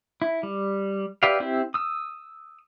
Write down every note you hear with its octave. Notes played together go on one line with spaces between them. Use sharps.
E4
G3
G4 B4 D5 E5 F5
C4 E4 G4
D#6 E6